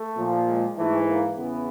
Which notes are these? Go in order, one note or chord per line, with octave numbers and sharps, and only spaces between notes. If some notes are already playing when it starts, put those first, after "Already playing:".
Already playing: A3
A#2 F3
G#3
G#2 E3 A3
A#3
E2 C#3 E3 B3